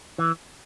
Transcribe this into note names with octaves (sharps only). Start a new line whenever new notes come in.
E3